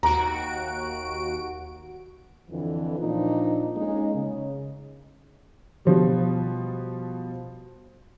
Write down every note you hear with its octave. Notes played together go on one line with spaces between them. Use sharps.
D#2 F#4 A#5 D7
F2 D3 E3
A#2 F3 D4 D#4
G#3 A#3 C#4 D#4
C#3
B2 F3 G3